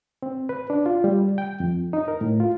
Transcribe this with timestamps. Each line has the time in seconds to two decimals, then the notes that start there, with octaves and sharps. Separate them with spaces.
0.22 C4
0.49 B4
0.70 D4
0.86 F4
1.04 G3
1.38 G5
1.60 F2
1.93 D#4
2.08 A#4
2.21 A2
2.40 F4